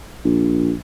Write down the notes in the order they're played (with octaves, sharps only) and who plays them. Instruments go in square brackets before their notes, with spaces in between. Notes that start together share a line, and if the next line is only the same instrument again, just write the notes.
[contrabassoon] A#1